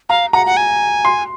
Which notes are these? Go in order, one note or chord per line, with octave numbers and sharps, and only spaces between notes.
F5 A#5
F#5 A#5
F#5
G#5
C6